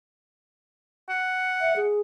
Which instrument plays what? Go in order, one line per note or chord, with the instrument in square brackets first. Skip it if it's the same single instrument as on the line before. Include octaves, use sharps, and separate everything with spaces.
[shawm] F#5
[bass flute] E5
G#4